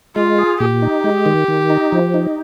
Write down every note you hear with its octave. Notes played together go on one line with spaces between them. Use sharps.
G#3 F4
G#4
A#2 G4
D#4
G#3
D#3
D#3
D#4
F3
D#4